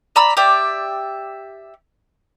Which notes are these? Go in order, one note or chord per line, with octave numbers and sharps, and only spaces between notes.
D5 A#5 B5 E6
G4 D5 E5